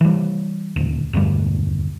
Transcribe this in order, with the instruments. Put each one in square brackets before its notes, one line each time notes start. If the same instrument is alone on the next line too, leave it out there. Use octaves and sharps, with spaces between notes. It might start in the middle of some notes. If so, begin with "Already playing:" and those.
[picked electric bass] E3 G3
D#1 D2
E1 D2 G2 G3